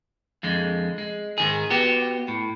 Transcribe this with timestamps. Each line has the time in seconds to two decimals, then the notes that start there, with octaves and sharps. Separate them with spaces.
0.43 F2 D3 G#3
0.98 G#3
1.38 G#2 D#3 G#4
1.70 B3 F#4 G4
2.28 A2